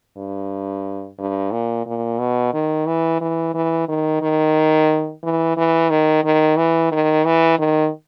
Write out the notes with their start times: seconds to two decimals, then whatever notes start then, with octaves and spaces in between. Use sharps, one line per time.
0.17 G2
1.19 G2
1.52 A#2
1.86 A#2
2.19 B2
2.53 D#3
2.86 E3
3.21 E3
3.54 E3
3.88 D#3
4.21 D#3
5.23 E3
5.57 E3
5.90 D#3
6.24 D#3
6.57 E3
6.91 D#3
7.25 E3
7.58 D#3